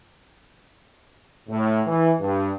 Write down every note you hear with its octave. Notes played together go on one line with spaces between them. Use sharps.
A2
E3
G2